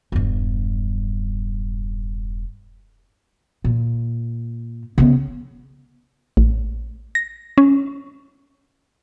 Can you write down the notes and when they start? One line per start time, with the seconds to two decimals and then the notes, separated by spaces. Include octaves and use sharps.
0.12 E1 G2
3.64 A#2
4.98 C#3 B3
6.37 A1
7.15 A#6
7.58 C#4